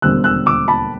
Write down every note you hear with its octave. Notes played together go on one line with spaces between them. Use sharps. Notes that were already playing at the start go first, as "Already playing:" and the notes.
E1 D#2 D3 G3 C4 E6 F#6
E6 F#6
D6 E6
A5 B5